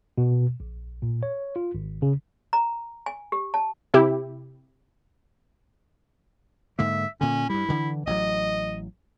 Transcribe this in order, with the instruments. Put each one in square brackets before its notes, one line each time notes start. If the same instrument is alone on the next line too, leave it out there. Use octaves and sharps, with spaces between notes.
[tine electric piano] B2
A#1
A#2
C#5
F4
G#1
C#3
[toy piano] A#5
G#5
G4
A5
[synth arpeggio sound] C3 E4 G4
[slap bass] G#2 D3 A#3 [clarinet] E5
[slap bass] A#2 D3 [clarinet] C#4
[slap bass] G2 G3 [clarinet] E4
[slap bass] D3 E3
[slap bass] A1 F#3 [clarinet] D#5